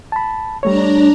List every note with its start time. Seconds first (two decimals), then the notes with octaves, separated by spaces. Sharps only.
0.12 A5 B5
0.63 G3 A3 D4 C#5 A#5